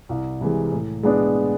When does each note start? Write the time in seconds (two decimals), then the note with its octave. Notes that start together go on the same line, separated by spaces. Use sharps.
0.09 C2
0.41 C3 E3 G#3
0.72 A2
1.03 G#3 B3 D4